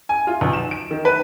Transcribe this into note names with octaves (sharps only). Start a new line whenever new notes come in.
G#5
F4
B1
E7
D7
D#3
B4